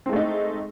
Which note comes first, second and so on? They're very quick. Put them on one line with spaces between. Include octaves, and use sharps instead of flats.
C4 G#3 A3 D#4